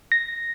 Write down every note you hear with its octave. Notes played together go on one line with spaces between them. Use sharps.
A#6